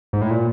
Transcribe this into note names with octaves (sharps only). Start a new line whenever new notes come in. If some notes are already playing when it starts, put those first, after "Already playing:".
G#2
A2
A#2